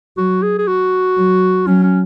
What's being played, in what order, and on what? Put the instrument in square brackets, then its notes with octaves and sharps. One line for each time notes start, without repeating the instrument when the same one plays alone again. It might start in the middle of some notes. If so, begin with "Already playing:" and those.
[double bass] F#3 [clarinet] F#4
[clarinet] G#4
G#4
F#4
[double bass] F#3
[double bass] F#3 [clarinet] C#4
[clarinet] C#4